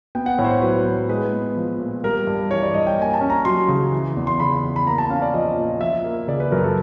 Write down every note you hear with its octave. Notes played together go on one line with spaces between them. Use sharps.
B3 G5
F#5
A2 C#5
C5
C#5
F#3 B4
A2
G#3 B4
B3
F3
A#2
G3 A#4
G2
E3 C#5
D5
G2 D#5
G5
A#3 G#5
A5
C#4
A#5
F#3 C6
C#3
E3
E2
C6
C#3 B5
E2
B5
A#3 A#5
A5
C#4 F5
D5
F3 D#5
A#2
F3 E5
A#3
C#3 D5
B4
F#2 A#4
A4